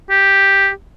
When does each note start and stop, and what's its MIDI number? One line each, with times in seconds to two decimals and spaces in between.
0.10 0.69 67